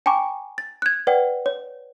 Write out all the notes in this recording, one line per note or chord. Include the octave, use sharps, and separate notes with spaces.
G5 G#5 A#5 C#6 D6
A6
F#6 G#6
B4 D5 F#5 G5
C#5